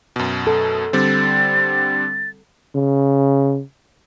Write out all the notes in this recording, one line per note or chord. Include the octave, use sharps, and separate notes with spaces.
F#2 B2
A4
D3 G3 C4 A6
C#3